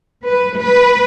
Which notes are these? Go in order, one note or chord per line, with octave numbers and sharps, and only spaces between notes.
B4
B4